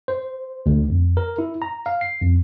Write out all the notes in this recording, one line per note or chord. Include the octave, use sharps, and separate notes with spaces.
C5
D2
F2
A#4
E4
A#5
F5
C7
F2